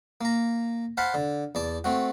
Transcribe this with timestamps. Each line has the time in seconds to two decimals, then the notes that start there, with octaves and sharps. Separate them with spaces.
0.21 A#3 A#5
0.97 C5 F5 F#5 A5 B5
1.14 D3
1.55 E2 D5 A5
1.84 A3 C4 F#4